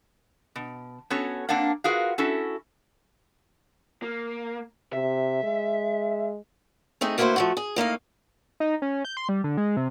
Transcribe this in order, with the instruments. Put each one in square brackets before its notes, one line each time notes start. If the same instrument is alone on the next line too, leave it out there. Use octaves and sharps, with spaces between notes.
[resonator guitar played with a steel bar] B2
B3 C#4 F#4 A4 C#5
A#3 C4 D4 D5 F5 F#5
F4 F#4 G#4 A#4 B4 F5
C#4 E4 F#4 A4
[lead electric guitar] A#3
[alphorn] C3 [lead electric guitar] E5
[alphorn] G#3
[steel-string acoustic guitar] A3 C4 D#4 G#4
D2 A#3 E4 F#4 B4 C5
F3 A3 F#4
G#4
A2 A#3 D#4 F5
[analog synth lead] D#4
C#4
G6
C6
G3
D3
G#3
C3